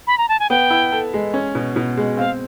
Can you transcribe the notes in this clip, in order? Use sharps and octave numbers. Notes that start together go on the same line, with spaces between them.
B5
A#5
A5
G#5
B3 G5
E4
A4
G#3
C#4
B2
B2
G#3
C4 F5